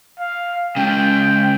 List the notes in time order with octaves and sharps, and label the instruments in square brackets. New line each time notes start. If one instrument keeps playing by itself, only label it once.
[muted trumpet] F5
[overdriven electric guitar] C#2 C#3 [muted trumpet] G5